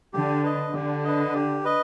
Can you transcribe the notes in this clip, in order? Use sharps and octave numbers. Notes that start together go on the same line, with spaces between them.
D3 G4
B4 D#5
D3 G4
B4 D#5
G4
B4 D#5